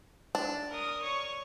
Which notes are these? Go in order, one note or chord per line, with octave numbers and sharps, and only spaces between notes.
D4
A#4 D#6
C#5 C#6